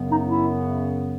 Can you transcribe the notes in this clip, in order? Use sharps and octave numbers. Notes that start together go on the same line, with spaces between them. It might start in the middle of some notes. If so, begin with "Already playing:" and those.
Already playing: F#2 C#3 F#3 B3
D#4
E4